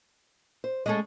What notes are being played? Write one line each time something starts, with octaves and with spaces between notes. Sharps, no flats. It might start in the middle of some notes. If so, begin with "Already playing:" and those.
C5
G#3 A3 C#4 G#4 A4 D#5